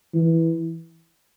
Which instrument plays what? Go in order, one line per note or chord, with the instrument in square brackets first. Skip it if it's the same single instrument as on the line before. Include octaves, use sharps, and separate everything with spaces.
[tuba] E3